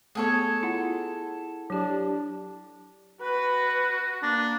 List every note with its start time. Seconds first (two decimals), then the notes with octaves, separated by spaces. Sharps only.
0.15 A3 B3 G#4 A4 C#5
0.63 E4 F4 F#5
1.70 F#3 D4 G4
3.21 F#4 B4
4.22 A#3 D4